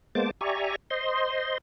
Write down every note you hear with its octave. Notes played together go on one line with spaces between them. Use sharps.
G#3 A#3 B3 C5 A5 D6
G4 D5 E5 G#5 A#5 C#6
C5 D#5 C6